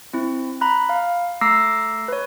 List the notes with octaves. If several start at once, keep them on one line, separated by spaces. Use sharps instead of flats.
C4 E4
A#5 B5 F#6
F5
A3 A#5 D6 E6 A#6 C7
B4 C#5